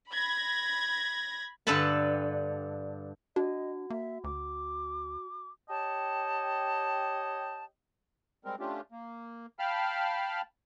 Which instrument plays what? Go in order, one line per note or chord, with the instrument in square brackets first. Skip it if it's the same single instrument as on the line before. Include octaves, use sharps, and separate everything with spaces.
[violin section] B5 G#6 A#6
[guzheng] G2 D3 A4 B4 A5 B5
[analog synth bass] D4 [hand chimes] F#4 [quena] D#5
[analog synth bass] A#3 [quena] E5
[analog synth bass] D2 [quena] D6
[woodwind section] G4 C#5 D#5 G5 A5
[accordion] G3 G#3 C4 A#4
A3 C#4 D4 F4 G4
A#3
F5 G5 A5 B5 F6